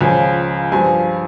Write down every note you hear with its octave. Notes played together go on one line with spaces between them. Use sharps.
C#2 C#3 F3 G#5
G2 F3 G#5